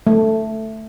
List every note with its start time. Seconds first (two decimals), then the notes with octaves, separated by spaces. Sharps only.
0.07 A3